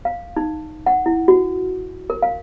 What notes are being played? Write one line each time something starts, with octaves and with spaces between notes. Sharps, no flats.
F5
D#4
F#5
E4
F#4
A#4
F5